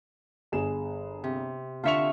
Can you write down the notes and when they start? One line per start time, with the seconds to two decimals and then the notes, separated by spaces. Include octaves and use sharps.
0.52 G1 G#4 E7
1.24 C3
1.84 D3 F4 E5 C#6 C#7 F7